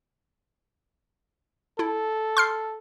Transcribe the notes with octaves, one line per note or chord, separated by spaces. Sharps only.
E4 A4
C6 F6 C7